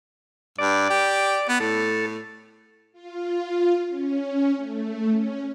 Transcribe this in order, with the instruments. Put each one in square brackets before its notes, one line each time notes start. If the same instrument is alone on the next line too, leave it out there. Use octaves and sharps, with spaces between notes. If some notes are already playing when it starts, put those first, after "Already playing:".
[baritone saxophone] G2 [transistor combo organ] D5
[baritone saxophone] G4
B3
[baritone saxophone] A2 [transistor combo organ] A4
[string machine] F4
C#4
A3
C#4